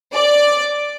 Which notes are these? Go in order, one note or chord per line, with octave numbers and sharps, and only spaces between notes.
D5